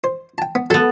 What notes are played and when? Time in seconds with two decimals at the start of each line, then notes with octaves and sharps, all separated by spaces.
0.04 C5
0.38 G5 A5
0.55 B3
0.70 F#3 B3 A4